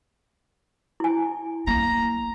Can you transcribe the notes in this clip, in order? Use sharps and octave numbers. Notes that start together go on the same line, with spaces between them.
E4 G#5
A#3 A#5